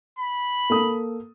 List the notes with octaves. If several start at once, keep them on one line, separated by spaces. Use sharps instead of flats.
B5
A#3 A4 D#6